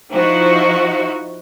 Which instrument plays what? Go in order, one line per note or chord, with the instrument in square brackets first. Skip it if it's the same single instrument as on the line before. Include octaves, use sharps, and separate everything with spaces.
[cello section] F3 D#4 E4 F#4